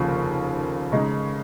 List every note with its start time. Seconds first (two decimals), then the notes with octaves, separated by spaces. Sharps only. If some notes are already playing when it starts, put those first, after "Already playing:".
Already playing: F1 D#2 C#3 F3 A#3
0.92 C#3 G#3 D#4